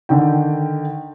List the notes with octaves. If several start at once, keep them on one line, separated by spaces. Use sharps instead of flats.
D3 D#3 G5